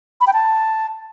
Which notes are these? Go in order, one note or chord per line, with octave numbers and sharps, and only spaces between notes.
B5
G5
A5